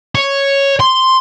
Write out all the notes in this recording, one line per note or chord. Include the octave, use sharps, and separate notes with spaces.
C#5
C6